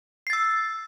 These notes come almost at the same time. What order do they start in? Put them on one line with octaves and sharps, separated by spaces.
C7 A6 E6